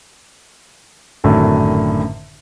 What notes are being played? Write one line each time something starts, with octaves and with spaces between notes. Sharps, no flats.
G#1 F#2 A2 D3 D#3